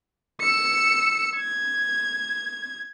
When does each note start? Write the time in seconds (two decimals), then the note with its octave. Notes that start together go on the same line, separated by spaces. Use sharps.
0.41 E6 C#7
1.36 G#6